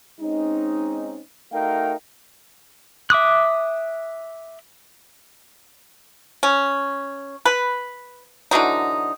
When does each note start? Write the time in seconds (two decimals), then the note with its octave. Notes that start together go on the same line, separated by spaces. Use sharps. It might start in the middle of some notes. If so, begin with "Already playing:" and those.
0.20 G#3 C4 C#4 D#4
1.52 A3 D#4 F#4 A#4 F5 G5
3.10 E5 D6 D#6 F#6
6.43 C#4
7.45 B4
8.51 D3 E3 F#3 D#4